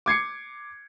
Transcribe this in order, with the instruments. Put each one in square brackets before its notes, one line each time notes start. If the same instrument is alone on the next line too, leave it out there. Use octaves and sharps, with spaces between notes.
[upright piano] D6 G#6 C7 C#7